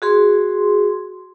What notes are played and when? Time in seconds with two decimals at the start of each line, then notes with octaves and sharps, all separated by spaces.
0.02 F#4 G#4 C6